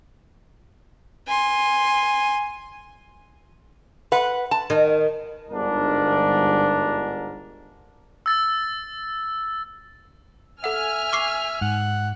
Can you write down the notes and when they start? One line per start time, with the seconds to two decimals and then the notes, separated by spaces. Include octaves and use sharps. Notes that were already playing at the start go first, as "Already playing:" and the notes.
1.27 G#5 C6
4.12 B4 F#5
4.51 A5
4.70 D#3
5.50 G1 G#2 D4 A#4
8.26 E6 A6
10.64 A4 E5 F#5 G#5 F6
11.13 C#6 D6 C7
11.61 G#2 F#5